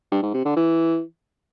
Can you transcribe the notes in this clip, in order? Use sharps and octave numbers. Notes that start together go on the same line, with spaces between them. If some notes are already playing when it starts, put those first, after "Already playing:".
G2
G#2
C3
D3
E3